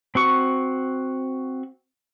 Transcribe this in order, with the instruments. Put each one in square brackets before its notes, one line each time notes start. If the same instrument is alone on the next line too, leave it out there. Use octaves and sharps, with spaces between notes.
[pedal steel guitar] C4 F#4 C#6